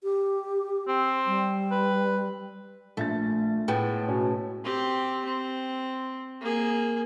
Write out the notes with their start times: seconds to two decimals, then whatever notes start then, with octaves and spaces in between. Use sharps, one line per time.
0.04 G4
0.88 C4
1.26 G3
1.71 B4
2.97 A#1 A3 A6
3.68 A2 G#3 B3 G5
4.08 B2 C#4
4.64 C4 G4
5.25 C4
6.41 A#3 G#4